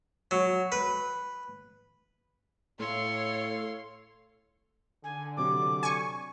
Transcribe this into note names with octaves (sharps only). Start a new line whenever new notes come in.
F#3
B4
A2 A4 C#5 F5 C6
D3 G#5
C3 F#3 C4 D6
G#5 C#6